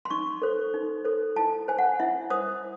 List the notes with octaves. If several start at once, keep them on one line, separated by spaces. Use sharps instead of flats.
C6
D#4 C#6
A4 C5
D#4
A4 C5
E4 A5
C5 G#5
F#5
E4 E5
C5 D#6